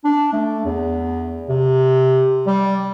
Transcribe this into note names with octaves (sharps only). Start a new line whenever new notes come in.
D4
A3
E2
C3
G3